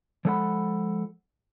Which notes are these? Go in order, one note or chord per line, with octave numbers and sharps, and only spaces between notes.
F3 G#3 A4 D#5 F#5 B5